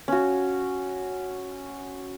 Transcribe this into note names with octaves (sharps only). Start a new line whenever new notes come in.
C#4 F#4